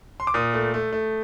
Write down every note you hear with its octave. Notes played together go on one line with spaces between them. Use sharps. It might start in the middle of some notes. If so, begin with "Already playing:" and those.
C6
D6
A#2 D#6
A3
A3
A3